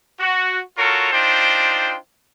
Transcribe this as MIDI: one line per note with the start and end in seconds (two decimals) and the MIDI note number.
0.19 0.60 66
0.77 1.10 65
0.77 1.10 66
0.77 1.10 69
0.77 1.10 70
0.77 1.10 73
1.11 1.95 62
1.11 1.95 63
1.11 1.95 65
1.11 1.95 72
1.11 1.95 79